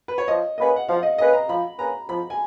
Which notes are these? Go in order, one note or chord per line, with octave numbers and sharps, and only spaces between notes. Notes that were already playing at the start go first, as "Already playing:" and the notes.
B4
C#5
F3 D#5
A#3 C#4 G#4 B4 D#5
F#5
F3 F5
D#5
A#3 C#4 G#4 B4 D#5
A#5
F3 B5
A#3 C#4 G#4 B4 A#5
F3 B5
G#5